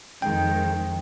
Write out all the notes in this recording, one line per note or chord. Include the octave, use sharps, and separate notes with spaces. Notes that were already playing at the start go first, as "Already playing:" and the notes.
F2 D#3 G#3 G5